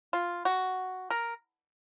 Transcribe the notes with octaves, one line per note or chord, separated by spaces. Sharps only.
F4
F#4
A#4